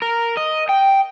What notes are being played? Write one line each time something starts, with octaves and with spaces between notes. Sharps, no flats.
A#4
D#5
G5